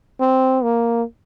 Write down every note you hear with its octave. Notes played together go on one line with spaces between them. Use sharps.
C4
A#3